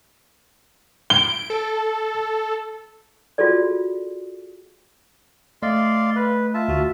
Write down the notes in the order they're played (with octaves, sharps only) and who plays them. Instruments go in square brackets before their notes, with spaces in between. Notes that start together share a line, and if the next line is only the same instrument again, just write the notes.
[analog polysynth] D7 [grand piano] G7
[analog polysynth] A4
[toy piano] F4 F#4 G#4 A4 D5
[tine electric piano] A3 D#5 [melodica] D5 F5 C6
[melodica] B4
F4 E5 A5
[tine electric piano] D2 F#4